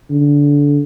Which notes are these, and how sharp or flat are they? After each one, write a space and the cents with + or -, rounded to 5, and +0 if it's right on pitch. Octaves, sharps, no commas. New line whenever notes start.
D3 -20